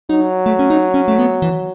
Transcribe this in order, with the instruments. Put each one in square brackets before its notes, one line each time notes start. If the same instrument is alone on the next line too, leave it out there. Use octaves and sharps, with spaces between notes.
[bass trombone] F#3 [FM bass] D#4
[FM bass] A3
C#4
D#4
C#4
A3
B3
E3